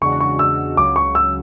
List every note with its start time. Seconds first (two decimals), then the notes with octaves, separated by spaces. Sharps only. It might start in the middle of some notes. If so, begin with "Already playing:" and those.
0.01 E2 C#3 G#3 D4 F#4 C#6
0.20 C#6
0.39 E6
0.77 C#2 C#3 F#3 D6
0.96 C#6
1.15 E6